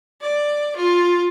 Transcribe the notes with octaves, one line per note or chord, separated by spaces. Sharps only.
D5
F4